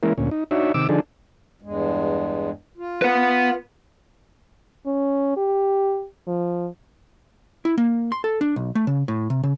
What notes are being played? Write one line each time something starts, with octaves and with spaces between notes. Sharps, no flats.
E3 G#3 A#3 C#4 E4 A#4
D2 A#2 C#4
D#4
D4 D#4 F#4 C#5 E5
C3 D#3 D6 E6
D3 F3 D4 D#4 G#4 A4
E2 G2 G#3
F4
B4 F#5
C#4
G4
F3
E4
A#3
C6
A4
D4
B1
A3
C#3
A2
C3
C#3